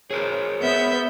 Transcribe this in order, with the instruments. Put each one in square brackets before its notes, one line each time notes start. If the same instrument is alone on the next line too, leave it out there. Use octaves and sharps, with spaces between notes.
[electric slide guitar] G#4 A#4 C5 [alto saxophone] C#5
[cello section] B3 [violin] E5 G6